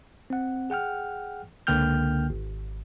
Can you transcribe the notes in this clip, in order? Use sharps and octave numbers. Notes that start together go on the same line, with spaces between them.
C4 F#5
G#4 F#5 G5 F6
C#2 D3 A#3 G5 F6 G6
G#1